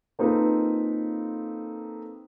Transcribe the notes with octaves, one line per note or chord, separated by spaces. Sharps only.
A#3 C4 D#4 F4 A4 B4